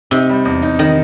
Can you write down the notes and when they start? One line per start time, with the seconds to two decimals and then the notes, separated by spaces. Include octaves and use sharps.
0.11 C3 D#4
0.29 G3
0.45 E2
0.62 D#4
0.79 D#3 D#4